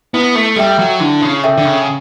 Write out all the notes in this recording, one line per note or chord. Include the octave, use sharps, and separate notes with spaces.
B3 E4
A3
G3 A4 E5 G5
F#3
D3 E4
C#3
A4 E5 G5
D3
C#3